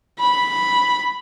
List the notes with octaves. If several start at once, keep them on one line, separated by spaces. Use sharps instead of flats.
B5